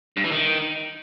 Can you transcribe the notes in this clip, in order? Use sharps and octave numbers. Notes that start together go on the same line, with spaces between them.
G2
E3
D#3